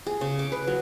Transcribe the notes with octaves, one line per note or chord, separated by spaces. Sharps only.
G#4
C#3
D6
B4
F#3